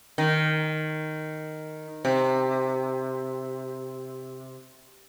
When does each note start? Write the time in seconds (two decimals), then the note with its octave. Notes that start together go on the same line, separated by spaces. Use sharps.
0.18 D#3
2.05 C3